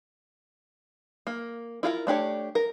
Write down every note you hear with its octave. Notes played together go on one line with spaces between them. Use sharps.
A#3
E4 F4 G#4 A#4
A3 D4 G4 C#5
A#4